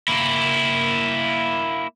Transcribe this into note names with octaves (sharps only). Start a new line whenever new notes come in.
A#3 E4